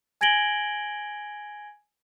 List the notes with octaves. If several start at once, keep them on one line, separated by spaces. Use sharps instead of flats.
G#5 G#6 A#6 D7 F#7 G7